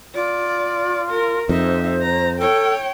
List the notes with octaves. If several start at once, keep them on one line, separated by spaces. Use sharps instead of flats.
F4 D5
A#4
F2 D#4 C5 E5
A#5
A4 C#5 G5